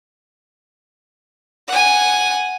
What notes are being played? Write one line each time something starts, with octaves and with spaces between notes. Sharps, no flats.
F#5 G#5